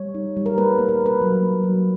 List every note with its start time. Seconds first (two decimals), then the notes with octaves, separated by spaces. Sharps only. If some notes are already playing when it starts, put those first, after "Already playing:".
Already playing: G3 C#5
0.15 D#4
0.37 G3
0.46 A#4
0.57 A#3 B4
0.79 A#3
0.89 A#4
1.00 A#3
1.06 B4
1.21 F#3
1.42 A#3
1.64 F#3